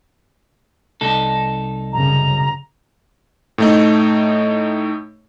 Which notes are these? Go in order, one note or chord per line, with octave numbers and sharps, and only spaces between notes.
C2 D#4 A4
F#2 C#3 A#5
A2 A3 D#4